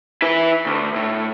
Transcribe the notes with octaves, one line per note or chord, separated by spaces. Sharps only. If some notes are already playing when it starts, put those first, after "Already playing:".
E4 B4
D2
A2